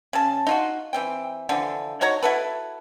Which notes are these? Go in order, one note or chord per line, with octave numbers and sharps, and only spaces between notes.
C#3 A5
D#4 F4 F#4
E3 C4 G5
D3 E3 F3
D#4 F#4 C#5 A#5
E4 F#4 A4 B4